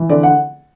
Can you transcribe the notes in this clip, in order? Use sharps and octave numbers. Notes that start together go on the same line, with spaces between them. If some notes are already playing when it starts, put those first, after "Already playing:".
Already playing: E3
D3 D5
F#5